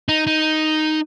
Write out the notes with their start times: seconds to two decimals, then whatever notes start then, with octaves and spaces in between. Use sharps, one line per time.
0.09 D#4
0.27 D#4